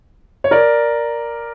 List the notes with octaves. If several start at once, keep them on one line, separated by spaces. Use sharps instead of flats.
C#5
A#4 D5